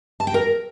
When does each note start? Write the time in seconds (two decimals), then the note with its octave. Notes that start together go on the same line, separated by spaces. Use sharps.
0.20 A5
0.27 G5
0.34 A#4